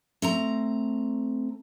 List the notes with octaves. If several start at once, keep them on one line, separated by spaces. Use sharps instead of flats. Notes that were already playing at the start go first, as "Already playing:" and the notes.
A3 C4 A#5